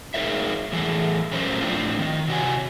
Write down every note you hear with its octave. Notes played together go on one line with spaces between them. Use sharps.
D#4 G#4 A#4 C#5 E5
A2 E3 A3 G#4 A4
A#2 F#3 A3 C#4 A#4 C5
A2 C4 D4 F4
D#3 D#4
C3 F#4 A#4 C#5 G#5